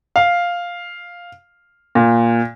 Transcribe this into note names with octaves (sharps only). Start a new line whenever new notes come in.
F5
A#2